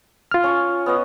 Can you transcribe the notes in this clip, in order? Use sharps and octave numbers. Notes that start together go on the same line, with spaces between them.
F4 F6
C#4 C#5 G#5
B3 C#4 D#5